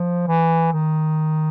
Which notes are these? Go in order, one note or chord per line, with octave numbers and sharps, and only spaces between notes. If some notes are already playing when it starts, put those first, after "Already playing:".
Already playing: F3
E3
D#3